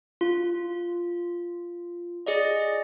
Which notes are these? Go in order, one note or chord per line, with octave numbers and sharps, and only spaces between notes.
F4
G#4 D5 D#5